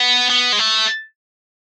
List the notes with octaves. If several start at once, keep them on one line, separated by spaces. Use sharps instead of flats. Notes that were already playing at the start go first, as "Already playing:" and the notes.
Already playing: B3
B3
G#3
A3